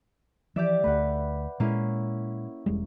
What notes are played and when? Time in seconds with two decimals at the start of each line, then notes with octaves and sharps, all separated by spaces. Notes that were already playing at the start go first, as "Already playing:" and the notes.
0.56 E3 F3 G4 D5 E5
0.84 D2 A3 B4 F#5
1.60 A#2 G#3 A#3 C#4 E4
2.66 E1 G3 G#3